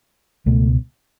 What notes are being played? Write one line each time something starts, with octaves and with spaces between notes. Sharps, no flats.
C#2 B2 A3